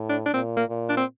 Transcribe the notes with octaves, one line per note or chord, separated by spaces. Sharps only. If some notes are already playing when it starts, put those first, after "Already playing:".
Already playing: A2
D4
D4
A#2 C4
A#3
A#2
D4
C4